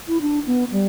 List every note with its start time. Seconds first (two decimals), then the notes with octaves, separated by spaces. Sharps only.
0.08 E4
0.21 D4
0.47 B3
0.72 G3